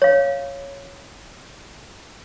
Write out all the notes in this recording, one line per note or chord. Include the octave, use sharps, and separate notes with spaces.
C#5 F5